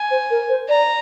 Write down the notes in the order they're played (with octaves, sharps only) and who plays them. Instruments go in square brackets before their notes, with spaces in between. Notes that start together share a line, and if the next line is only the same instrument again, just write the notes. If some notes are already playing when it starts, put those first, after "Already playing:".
Already playing: [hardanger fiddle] G#5
[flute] C5
A#4
C5
[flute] D5 [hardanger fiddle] A#5